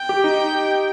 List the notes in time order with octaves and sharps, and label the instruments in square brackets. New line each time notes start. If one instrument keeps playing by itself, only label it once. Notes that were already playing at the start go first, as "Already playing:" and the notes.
Already playing: [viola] G5
[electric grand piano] G4
D#4